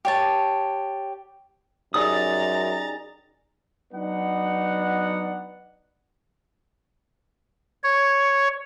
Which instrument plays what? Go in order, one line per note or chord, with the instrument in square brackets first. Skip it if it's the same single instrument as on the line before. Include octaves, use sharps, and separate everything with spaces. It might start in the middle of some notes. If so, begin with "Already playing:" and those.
[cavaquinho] G4 C#5 A5
[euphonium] F#2 [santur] G3 D#4 G#4 [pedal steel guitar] D5 D#6 [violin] A#5 A6
[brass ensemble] F#3 B3 D4 D#4 F#5
[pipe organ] C#5